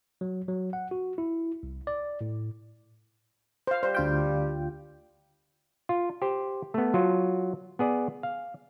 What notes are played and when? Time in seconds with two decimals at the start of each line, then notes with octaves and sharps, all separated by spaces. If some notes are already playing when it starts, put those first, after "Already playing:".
0.21 F#3
0.48 F#3
0.73 F#5
0.91 F#4
1.18 E4
1.63 C2
1.87 D5
2.21 A2
3.67 C5 F5
3.83 G3 C5
3.95 D2 F4 G5
5.89 F4
6.22 G4 C5
6.74 A3 B3
6.94 F#3 F4
7.79 B3 G#4 D5
8.23 F5